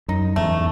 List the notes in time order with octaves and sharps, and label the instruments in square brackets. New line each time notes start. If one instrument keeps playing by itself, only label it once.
[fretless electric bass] F#2 [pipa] D#4
[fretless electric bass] E2 G#2 [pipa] A3